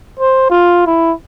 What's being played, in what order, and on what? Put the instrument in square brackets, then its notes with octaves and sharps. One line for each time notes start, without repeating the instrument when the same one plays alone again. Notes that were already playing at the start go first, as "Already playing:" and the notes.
[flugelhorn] C5
F4
E4